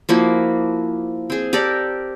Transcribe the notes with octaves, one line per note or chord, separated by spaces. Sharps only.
F3 A#3 E4 F#4
C4 G#4
G4 A4 A#4 D5